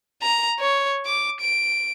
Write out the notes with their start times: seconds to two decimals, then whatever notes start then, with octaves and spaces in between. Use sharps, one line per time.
0.22 A#5
0.59 C#5
1.06 D6
1.41 D7